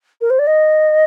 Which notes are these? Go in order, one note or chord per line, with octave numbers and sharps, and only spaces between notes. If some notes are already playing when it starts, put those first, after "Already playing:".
A#4
C5
D5
D#5